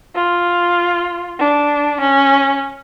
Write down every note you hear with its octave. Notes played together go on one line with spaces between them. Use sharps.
F4
D4
C#4